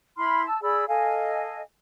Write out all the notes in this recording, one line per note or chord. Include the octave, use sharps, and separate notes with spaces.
E4 B5 C6 F6
A5 E6
G#4 D5 B5 E6
A4 D#5 F5 G#5